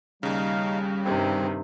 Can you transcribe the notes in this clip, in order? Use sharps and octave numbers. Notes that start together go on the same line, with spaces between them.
D#2 C#3 G3 D#4 F5
G2 C3 D#3 C4